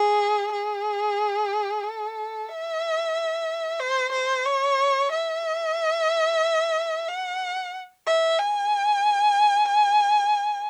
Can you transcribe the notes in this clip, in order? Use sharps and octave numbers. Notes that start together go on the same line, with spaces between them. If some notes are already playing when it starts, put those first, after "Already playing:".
Already playing: G#4
G#4
A4
E5
C5
C5
C#5
E5
F#5
E5
G#5